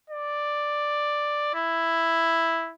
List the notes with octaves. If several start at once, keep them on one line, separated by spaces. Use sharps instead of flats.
D5
E4